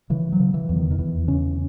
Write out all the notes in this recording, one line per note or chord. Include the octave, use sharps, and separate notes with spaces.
C#3 E3
F#3
C#3
E3
E2
D#3
D#3
E2 E3
C#3 C#4